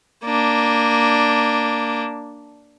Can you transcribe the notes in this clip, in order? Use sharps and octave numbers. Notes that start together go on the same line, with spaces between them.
A#3 D4